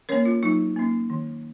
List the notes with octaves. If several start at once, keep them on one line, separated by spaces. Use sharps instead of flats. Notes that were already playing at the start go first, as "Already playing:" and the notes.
A#3 C#4 A#4 C#5
F4
F#3 D#4
A#3 C#4
D#3